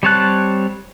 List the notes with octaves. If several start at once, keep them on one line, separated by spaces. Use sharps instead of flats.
G3 C4 C#5 A5 F#6